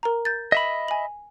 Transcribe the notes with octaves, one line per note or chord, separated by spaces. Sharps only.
A#4 A#5
G6 A6
D#5 E5 B5
G#5 F#7